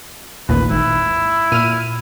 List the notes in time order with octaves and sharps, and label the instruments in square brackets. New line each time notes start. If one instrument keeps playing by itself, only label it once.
[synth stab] A1 D#2 A#2 [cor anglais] B4
[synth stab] G#1 [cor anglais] E4
[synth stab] A#2 F6 D#7